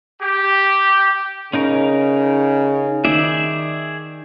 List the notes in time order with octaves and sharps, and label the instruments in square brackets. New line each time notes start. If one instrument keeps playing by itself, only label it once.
[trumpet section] G4
[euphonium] C#3 [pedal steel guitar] C#4 D#4 A#4
[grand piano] D#3 [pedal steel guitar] G#4 D5 E5